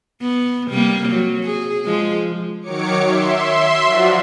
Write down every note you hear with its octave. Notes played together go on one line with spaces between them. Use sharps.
B3
C3 G3 A#3
F#3
G#4
F3 G#3
D#3 F#3 C#5 D6 C#7
E5 C6
F3 F#3 F4 F#4 D5